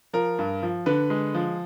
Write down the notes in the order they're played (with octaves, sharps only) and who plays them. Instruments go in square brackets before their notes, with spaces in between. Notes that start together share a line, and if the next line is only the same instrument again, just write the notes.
[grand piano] F3 A#4
G2
F3
D3 B4
G#3
F3